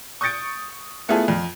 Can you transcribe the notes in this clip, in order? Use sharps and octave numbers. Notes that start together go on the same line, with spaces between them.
C#6 D#6 G6 A6 C#7 D7
A3 B3 E4 F4 G#4 A4
F2 F4